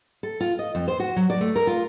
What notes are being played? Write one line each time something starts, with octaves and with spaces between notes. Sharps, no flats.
A4
F4
D#5
F2
C5
F#4
F#3
D5
A3
A#4
F4